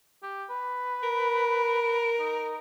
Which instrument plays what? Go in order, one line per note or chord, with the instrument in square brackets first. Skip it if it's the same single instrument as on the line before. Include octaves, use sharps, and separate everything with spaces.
[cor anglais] G4
B4
[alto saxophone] A#4
[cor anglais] D#4